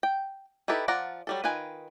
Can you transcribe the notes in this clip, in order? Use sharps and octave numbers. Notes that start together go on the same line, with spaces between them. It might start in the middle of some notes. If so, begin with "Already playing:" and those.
G5
D#4 E4 G4 A4 B4
F3 F4 D5 F#5 A#5
F#3 G3 A4
D#3 F4 B4 G#5